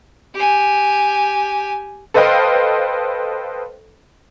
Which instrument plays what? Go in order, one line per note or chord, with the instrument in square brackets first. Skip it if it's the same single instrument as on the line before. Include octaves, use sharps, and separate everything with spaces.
[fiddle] G4 G#5
[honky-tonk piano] A4 B4 C5 D#5 F5 G5